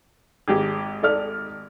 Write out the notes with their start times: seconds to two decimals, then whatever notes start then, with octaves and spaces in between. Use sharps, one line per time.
0.48 G#1 G4 G#4
1.03 A4 D5 F6